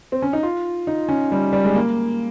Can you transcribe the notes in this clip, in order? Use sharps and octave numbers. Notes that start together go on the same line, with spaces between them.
C4
C#4
D#4
F4
D#4
C#4
G3
G3
G#3
A#3